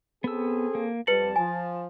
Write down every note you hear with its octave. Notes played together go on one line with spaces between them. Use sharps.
B3 C4 G#4 A4 E6
A#3
F2 G3 B4 A5 C#7 F#7
F3 G#5